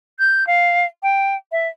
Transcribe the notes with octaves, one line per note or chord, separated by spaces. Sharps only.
G6
F5
G5
E5